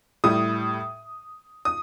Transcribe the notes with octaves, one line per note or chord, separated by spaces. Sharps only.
A2 G3 D#6
D#6